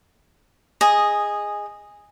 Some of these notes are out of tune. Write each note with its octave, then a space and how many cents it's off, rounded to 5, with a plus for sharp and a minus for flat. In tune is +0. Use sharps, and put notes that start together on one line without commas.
G#4 -10 D#5 +0